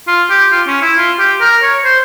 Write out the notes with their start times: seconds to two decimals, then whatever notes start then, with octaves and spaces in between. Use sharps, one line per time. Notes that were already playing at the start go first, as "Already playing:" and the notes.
0.08 F4
0.30 G4
0.52 F4
0.67 C#4
0.82 E4
0.97 F4
1.19 G4
1.41 A#4
1.63 C#5
1.85 C5